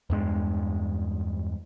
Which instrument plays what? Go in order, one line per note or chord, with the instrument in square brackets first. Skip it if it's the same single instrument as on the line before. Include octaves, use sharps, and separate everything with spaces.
[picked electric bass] E2 G2 G#3